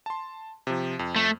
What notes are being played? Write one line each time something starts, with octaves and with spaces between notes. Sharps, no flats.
A5 C6
C3 F3
F2
A3